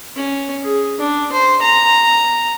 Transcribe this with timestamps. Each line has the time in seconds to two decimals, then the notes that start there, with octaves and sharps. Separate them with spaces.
0.17 C#4
0.64 G#4
0.99 D4
1.33 C5
1.62 A#5